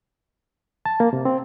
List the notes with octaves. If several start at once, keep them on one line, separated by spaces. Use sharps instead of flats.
A5
A#3
C3
C4